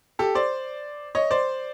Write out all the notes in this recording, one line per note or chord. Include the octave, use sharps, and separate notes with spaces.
G4 A4
C5 D5
C#5 D#5
C5 D5